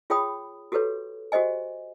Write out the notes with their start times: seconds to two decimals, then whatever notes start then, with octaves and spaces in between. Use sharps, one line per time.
0.10 F4 G#4 C#5 G5 B5 D#6
0.72 F#4 G4 A4 B4 C#5
1.32 F#4 G4 C5 D#5 G#5